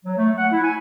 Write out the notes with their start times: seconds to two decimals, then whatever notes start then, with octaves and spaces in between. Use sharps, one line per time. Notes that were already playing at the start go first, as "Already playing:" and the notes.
0.05 F#3
0.18 A3
0.38 F#5
0.52 E4
0.64 G#5